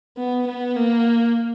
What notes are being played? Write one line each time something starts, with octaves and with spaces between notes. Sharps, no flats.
B3
B3
A#3